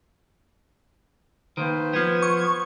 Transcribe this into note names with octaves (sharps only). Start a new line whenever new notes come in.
D#2 D#3 B4 C5
F3 B3 G#6
C#6